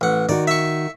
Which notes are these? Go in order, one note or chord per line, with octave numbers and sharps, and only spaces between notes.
A1 F#5
D#3 F#4 D5
E5 C#6